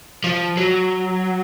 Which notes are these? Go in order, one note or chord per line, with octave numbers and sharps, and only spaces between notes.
F3
F#3